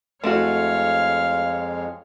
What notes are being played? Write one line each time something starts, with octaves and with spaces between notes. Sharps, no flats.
F2 G#3 A3 E4 F#4 C#5 F5